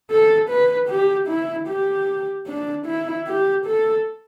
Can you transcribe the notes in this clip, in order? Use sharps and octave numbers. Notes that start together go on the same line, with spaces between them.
A4
B4
G4
E4
G4
D4
E4
G4
A4